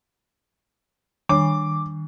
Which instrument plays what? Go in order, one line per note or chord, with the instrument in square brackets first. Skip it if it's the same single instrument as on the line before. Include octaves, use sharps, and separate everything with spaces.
[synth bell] D#3 [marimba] G3 D4 C#5 [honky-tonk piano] D6